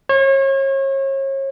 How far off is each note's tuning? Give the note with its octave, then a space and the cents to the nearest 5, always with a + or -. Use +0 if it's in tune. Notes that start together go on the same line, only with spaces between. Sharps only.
C#5 -35